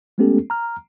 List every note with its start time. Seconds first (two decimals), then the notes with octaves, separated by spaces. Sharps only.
0.18 G#3 A3 B3 C#4 G4 A4
0.50 A#5 F6